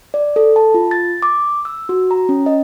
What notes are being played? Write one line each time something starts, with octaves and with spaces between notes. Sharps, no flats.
D5
A4
A5
F4
A6
D6
E6
F#4
A#5
C#4
D#5